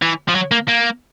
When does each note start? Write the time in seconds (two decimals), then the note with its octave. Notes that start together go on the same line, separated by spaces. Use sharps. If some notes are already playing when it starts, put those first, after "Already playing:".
0.02 E3
0.28 F3
0.35 F#3
0.51 A#3
0.68 A#3